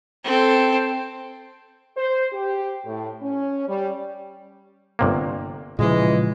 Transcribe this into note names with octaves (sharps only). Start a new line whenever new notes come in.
C4 A4
C5
G4
A2
C#4
G3
G1 C3 A#3
A#2 C#3 E3 F3 G#3